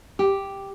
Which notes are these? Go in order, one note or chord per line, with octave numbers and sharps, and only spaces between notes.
G4